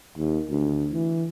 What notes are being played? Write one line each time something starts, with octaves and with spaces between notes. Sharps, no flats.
D#2
D2
E3